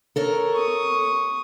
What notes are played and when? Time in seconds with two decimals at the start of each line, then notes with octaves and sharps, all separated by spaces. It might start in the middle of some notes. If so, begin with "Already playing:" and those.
0.16 A4 A#4 C#5
0.53 C#6 D#6